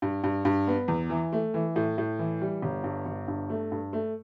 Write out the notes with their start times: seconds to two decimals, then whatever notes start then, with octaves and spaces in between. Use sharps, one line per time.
0.02 G2
0.24 G2
0.45 G2
0.67 B3
0.88 E2
1.10 E3
1.33 A3
1.54 E3
1.76 A2
1.98 A2
2.19 E3
2.41 G3
2.62 G1
2.84 G2
3.06 G1
3.28 G2
3.50 A3
3.72 G2
3.93 A3